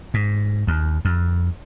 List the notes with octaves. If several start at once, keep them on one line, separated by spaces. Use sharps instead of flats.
G#2
D#2
F2